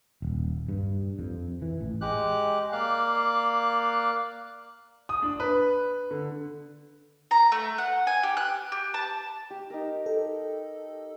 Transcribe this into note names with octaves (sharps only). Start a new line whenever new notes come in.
D#1
G2
F2
E3
A1
G#3 G4 F#6
A#3 D5 F5 F#6
D#6
D4
B4
D3
A#5
A3
F#5
G#5
G4
F#6
G4
A5
G4
D#4 A#4
A4